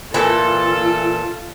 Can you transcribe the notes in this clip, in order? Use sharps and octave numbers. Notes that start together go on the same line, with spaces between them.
A#2 E3 F4 A4